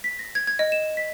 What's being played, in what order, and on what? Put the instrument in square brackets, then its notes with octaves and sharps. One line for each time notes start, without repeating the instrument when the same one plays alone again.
[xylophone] B6
A#6
G#6
G#6
D#5
E7
B6